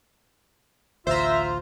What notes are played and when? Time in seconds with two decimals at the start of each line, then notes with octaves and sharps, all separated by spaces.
1.07 A1 D2 F4 C5 E5 A#5